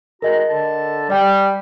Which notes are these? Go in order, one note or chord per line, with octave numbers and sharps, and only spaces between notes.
G#3 F#4 A#4 D#5 A#5
D3 A5
G3 D5 G5